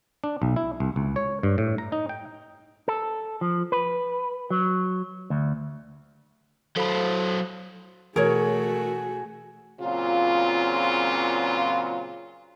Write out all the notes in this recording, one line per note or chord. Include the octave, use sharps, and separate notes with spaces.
D4
B1
E4
C2
C#2
C#5
G2
A2
A#5
D#4
G5
A4
F3
B4
F#3
D2
F#3 A4 C5 B5
B2 E3 A3 F#4 G#4 A#4 C#5
A#2 C#3 F#3 C4 F4